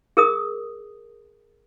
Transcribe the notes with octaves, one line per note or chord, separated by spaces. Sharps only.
G#4 A#4 D#6